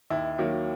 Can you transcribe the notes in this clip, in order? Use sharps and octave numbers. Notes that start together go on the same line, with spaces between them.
D#2 E4
D#3 F#3 A#3